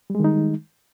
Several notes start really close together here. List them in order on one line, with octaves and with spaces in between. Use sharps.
G3 G#3 D#3 D#4